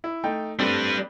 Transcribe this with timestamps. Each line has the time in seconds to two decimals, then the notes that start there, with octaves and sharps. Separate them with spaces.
0.04 E4
0.24 A3 D#4 G5
0.59 G3 A3 C4 D4 B4